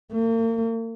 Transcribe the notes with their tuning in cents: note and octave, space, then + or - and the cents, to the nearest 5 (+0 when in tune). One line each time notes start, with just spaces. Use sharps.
A#3 -40